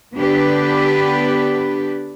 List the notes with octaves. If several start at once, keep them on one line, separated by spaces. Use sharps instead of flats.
D3 B3 D4 G4 B4